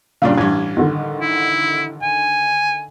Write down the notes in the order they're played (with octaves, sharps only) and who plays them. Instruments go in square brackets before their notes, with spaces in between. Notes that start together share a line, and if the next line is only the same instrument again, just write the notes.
[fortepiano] G2 A#2 C#3 [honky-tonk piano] D5 F5
[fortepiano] A1 G2 [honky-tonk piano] G#6
[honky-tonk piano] D3 D#3
[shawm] E4
G#5